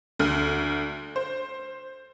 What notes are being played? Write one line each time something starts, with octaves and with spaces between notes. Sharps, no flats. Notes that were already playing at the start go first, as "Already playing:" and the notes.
D2 F6
C5